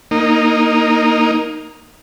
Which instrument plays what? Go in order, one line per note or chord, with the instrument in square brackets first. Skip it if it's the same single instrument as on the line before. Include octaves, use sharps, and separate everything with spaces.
[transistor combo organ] A#3 D#4